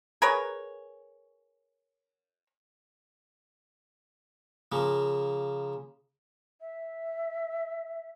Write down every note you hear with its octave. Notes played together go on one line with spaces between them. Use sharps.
G#4 A#4 B4 C#5
C#3 F3 A#3
E5